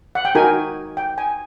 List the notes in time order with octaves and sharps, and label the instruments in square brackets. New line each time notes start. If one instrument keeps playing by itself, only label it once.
[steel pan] F#5
G5
D#4 F#4 A#4 G#5
G5
G#5